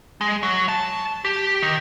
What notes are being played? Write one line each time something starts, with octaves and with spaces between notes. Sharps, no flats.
G#3
F#3
A5
G4
D#3